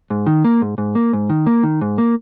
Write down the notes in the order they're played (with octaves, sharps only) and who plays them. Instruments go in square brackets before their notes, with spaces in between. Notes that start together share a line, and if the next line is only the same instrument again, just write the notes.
[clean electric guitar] G#2
D#3
A#3
G#2
G#2
A#3
G#2
D#3
A#3
D#3
G#2
A#3